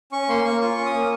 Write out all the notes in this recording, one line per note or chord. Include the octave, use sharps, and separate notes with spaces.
C#4 C#6
A#3 C6
A#3 C#6
F4 C#6
C#4
D#6
A#3